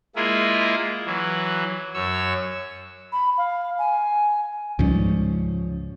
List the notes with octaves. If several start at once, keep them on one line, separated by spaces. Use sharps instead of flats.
G#3 A#3 E4 F4 G#4
E3 F#3
F#2 C#5 E6
B5
F5
G#5
C#2 G#2 C#3 F3 G3 C#4